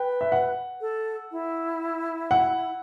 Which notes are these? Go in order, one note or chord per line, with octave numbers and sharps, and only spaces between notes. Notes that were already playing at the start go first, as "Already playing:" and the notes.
Already playing: B4 G5
E5
F#5
A4
E4
F#5